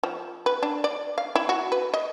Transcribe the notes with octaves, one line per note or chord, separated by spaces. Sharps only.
F3
B4
D4
D5
F5
E4
F#4
B4
D#5